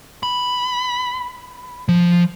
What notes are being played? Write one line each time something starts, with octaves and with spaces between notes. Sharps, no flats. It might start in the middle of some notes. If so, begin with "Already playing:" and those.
B5
F3